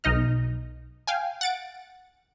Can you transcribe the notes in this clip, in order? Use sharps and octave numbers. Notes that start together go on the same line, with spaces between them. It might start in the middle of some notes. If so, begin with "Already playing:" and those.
B1 D#4 D#5 F6
F5 G5 G#5
F#5 A6 D7